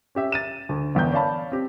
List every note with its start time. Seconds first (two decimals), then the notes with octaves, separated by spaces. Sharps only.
0.15 C#4 G4 E5
0.32 A6 D#7 E7
0.69 D2
0.95 G1 E2 G5 G6
1.12 C#5 D5 F5 A5 B5
1.52 C4 G4